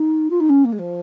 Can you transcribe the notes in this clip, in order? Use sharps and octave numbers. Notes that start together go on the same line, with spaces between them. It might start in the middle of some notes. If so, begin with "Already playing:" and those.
Already playing: D#4
F4
D#4
C#4
A#3
G#3
F3